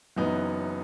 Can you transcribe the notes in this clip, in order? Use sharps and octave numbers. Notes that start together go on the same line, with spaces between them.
F#1 F#2 E3 B3 D#4